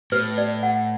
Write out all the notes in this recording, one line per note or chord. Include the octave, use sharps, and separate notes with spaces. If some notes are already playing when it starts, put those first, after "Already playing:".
A2 B4
D5
F#5